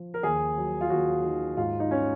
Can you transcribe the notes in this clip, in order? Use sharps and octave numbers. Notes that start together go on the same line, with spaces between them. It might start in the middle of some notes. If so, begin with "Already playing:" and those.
Already playing: F3
A#4
D#2 G#4
F#3
F4
D#2 F#4
D#3
G#2 F4
D#4
C#4